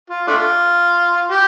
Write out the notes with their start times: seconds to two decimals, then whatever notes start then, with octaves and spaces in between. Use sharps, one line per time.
0.10 F4
0.28 A3 D4 F4
1.31 G4